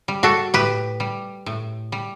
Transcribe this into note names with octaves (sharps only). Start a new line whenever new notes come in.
G3
F#4 A4
A2 G4 B4
G3
A2
G3